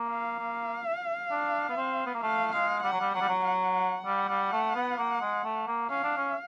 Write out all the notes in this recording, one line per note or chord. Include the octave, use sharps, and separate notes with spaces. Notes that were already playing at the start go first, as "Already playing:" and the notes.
Already playing: A#3
F5
A#3
D4
B3
C4
B3
A#3
A3 F5
G#3 F5
G3 F#5
F#3
G3
F#3 F#5
G3
F#3
F#5
F#5
G3
G3
A3
B3
A#3
G#3
A3
A#3
C#4 F5
D4
C#4